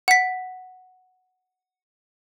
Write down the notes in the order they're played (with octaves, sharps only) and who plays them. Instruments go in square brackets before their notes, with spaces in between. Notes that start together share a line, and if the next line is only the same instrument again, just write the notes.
[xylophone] F#5 B6